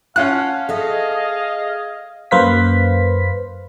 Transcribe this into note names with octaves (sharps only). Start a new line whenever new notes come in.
C#4 F4 F5 F#5 A5 F#6
G#4 A4 D#5 E5
F#2 A#3 B4 C5 F5 B6